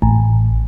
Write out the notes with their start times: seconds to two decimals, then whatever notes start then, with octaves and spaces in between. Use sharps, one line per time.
0.02 A1